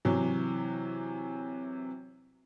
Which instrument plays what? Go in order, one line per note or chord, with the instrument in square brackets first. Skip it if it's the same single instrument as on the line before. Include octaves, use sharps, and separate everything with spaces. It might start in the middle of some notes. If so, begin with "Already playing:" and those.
[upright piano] C3 E3 F#3